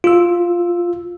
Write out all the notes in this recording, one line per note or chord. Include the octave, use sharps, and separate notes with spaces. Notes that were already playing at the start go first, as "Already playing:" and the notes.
F4 E6